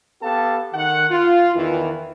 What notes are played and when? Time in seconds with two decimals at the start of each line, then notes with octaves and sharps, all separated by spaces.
0.23 B3 G4 A4 F5 A5
0.74 D#3 F#5
1.11 F4
1.56 E2 D#3 E3